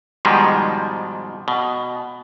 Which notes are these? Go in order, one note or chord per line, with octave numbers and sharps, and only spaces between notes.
G#2 B2 D#3 F3 G3 G#3
B2